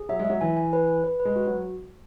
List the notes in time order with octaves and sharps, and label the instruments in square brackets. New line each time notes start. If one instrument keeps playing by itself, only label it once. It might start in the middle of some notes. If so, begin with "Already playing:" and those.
Already playing: [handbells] G#4
[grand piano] F#3 [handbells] E5
[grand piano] G#3
[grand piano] F#3 [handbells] E5
[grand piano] E3 [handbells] G#5
[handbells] G#5
B4
B4
B4
B4
[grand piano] G#3
[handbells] F#4
[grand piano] F#3